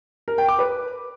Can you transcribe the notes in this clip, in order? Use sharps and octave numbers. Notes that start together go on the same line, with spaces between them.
A#4
G5
D6
B4